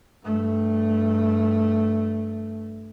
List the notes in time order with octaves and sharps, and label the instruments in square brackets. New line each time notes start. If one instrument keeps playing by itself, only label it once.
[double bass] G2 A3